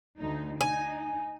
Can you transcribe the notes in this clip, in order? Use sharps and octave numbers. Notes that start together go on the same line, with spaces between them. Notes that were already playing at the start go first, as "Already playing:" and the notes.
D2 D#4
D#4 G#5